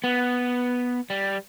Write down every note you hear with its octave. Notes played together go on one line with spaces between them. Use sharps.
B3
G3